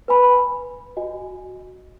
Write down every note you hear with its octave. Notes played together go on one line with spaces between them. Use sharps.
B4 G#5 B5
F#4 D#5 G#5